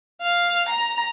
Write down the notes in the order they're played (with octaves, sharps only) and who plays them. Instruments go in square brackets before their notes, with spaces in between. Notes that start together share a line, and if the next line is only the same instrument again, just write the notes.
[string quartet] F5
A#5